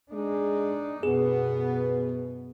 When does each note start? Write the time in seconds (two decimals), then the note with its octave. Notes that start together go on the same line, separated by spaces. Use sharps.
0.12 G#3 D4 D#4
1.03 F#2 B2 B3 G#4